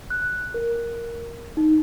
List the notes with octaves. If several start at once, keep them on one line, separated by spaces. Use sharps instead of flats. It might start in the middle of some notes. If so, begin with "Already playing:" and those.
F#6
A#4
D#4